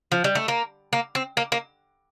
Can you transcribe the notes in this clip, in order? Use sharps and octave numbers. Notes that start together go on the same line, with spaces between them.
F3
G3
A3
A#3
A#3
C4
A#3
A#3